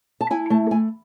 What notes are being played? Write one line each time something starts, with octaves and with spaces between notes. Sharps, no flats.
A5
E4 G#5
A3 A5
A3 G#5